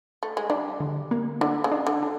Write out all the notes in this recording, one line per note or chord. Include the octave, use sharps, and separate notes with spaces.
A3
G#3
G3 D4
D3
A#3
D3 D4
C#3
D4
D3
D4